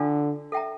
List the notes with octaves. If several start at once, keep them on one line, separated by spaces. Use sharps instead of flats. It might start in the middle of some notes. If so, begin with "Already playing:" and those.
Already playing: D3 D4 F4 A4
A4 E5 G5 A#5